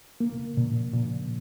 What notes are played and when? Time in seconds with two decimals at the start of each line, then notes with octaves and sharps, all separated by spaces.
0.20 A#3
0.57 A#2
0.93 A#2